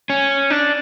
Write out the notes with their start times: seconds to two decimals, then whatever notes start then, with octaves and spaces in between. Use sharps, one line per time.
0.10 C#4
0.50 D4